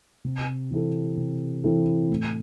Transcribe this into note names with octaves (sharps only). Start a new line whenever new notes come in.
C3
E3 C4 E4 A4
C3
E3 C4 E4 A4
A2